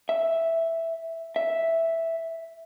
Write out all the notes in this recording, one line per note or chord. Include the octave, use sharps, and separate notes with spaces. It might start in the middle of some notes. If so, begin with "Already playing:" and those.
E5
E5